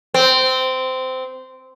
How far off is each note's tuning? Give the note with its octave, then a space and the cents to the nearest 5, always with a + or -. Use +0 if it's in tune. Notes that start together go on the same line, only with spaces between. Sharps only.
C4 -15